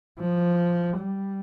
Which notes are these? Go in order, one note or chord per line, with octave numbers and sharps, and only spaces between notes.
F3
G3